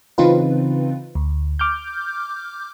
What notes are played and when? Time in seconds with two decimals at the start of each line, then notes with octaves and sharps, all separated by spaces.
0.18 C#3 E3 C4 D#4 F4 B4
1.15 D2
1.59 D6 F6 G6